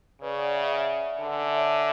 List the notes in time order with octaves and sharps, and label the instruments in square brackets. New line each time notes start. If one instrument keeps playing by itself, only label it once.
[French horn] C#3 [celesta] B4 D5
[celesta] D5 F#5
E5 G#5
E5 G#5
[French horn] D3 [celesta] F#5 A5
[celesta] E5 G#5
E5 G#5
C#5 E5
E5 G#5